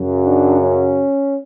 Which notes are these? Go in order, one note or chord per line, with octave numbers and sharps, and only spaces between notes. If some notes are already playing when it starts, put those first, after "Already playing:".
Already playing: F#2 C#3 F#3
D4
C#4